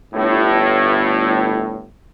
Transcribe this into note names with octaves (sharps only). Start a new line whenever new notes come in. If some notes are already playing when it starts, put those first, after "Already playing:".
G1 A2